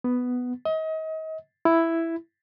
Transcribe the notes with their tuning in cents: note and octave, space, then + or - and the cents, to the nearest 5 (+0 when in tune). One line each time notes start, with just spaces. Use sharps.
B3 +5
D#5 +35
E4 +5